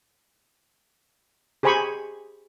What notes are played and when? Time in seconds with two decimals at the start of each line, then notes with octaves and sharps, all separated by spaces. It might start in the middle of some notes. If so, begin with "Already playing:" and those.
1.63 G4 G#4 C5 G#5 B5 C#6